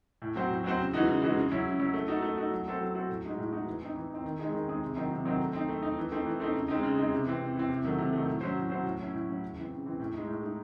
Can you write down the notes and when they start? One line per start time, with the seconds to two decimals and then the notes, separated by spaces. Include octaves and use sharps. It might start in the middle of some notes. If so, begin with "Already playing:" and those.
0.22 A2
0.36 F#3 C4 F#4 C5
0.51 A2
0.64 F#3 C4 F#4 C5
0.80 C#3
0.93 E3 G#3 D#4 F#4
1.07 C#3
1.22 E3 G#3 D#4 F#4
1.37 C#3
1.52 F#3 C#4 E4
1.66 C#3
1.79 F#3 C#4 E4
1.94 A3
2.08 D#4 F#4 A4
2.22 A3
2.37 D#4 F#4 A4
2.52 F#3
2.66 C4 F#4 A4 C5
2.81 F#3
2.95 C4 F#4 A4 C5
3.09 A2
3.24 G#3 D#4 F#4
3.38 A2
3.52 G#3 D#4 F#4
3.66 E3
3.82 C4 D#4
3.95 E3
4.10 C4 D#4
4.24 D#3
4.39 G#3 C4 D#4 G#4
4.52 D#3
4.68 G#3 C4 D#4 G#4
4.82 C3
4.96 D#3 F#3 C4 D#4
5.11 C3
5.25 D#3 F#3 C4 D#4
5.39 A3
5.53 C4 D#4
5.69 A3
5.82 C4 D#4
5.98 E3
6.12 A3 C4 D#4
6.25 E3
6.40 A3 C4 D#4
6.54 C#3
6.68 G#3 C4 D#4
6.83 C#3
6.98 G#3 C4 D#4
7.12 C3
7.26 E3 C4
7.40 C3
7.56 E3 C4
7.70 C3
7.84 D#3 F#3 A3
7.98 C3
8.13 D#3 F#3 A3
8.27 A2
8.41 F#3 C#4 F#4 C5
8.56 A2
8.70 F#3 C#4 F#4 C5
8.84 A2
8.99 F#3 C#4 E4
9.13 A2
9.28 F#3 C#4 E4
9.42 C#3
9.57 E3 C4
9.71 C#3
9.86 E3 C4
10.00 A2
10.14 G#3 D#4
10.28 A2
10.42 G#3 D#4